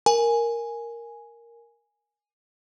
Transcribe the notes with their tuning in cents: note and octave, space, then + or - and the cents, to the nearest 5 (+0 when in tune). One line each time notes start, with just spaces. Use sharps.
A#4 +0 G#5 +0